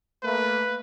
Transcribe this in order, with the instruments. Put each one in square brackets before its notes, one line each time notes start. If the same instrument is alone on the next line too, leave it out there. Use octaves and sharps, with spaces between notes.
[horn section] A3 A#3 [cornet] B4